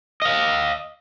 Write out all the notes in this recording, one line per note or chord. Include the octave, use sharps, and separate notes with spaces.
D#5 F5